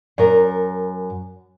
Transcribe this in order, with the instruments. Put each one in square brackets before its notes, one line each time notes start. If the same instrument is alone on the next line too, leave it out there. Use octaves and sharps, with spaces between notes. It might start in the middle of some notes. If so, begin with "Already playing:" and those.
[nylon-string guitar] F#2 A#4